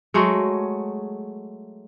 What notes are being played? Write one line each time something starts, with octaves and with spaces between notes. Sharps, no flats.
F#3 G#3 A3